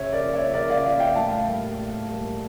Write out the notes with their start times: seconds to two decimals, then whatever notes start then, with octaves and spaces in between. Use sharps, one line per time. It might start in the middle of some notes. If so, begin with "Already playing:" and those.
Already playing: C#3 C#5 E5
0.13 A#4 D5
0.24 F3 A#3
0.34 C#5 E5
0.54 C#3 A#4 D5
0.70 D5 F5
0.85 F3 A#3 D5 F5
1.00 E5 G5
1.15 A2 F5 A5
1.46 G3 A#3
1.78 A2
2.09 G3 A#3